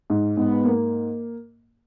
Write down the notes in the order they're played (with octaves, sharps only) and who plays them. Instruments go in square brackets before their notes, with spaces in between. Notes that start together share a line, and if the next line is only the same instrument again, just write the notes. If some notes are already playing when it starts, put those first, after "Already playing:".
[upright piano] G#2
[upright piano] G#2 [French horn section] G#3 B3
[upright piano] A#3